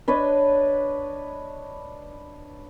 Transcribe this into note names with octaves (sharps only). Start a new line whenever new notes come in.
D4 B4 C#5 D#5